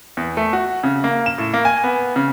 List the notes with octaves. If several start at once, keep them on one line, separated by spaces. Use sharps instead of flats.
E2
A3
F#4
C#3
A#3
E7
A2
A#3
G#5
B3
C#3